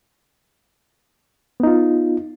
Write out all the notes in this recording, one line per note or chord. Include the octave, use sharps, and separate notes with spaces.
B3 D#4 F4